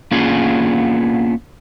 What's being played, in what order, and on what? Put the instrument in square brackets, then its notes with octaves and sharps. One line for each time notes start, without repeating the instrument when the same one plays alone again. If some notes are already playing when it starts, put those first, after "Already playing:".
[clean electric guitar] A#3 B3 C#4 D4 F4 G#4